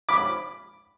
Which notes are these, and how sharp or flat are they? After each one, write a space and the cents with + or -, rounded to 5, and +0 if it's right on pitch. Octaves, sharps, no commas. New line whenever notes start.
B5 +0 D6 +0